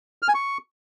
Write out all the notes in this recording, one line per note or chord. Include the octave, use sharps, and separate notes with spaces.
F6
G#5
C#6